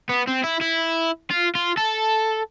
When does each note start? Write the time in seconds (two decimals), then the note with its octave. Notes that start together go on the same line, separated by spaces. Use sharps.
0.09 B3
0.28 C4
0.44 E4
0.61 E4
1.31 F4
1.55 F4
1.77 A4